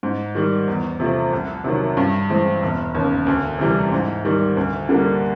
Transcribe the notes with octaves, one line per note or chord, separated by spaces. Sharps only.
G#2
D#3 G3
E2
C3 F3 A3
C2
C3 D#3 F#3
G2
E3 G#3 C4
E1
D#2 C#3
D2
C3 E3 G3
G#2
D#3 G3
D2
D3 G3 A#3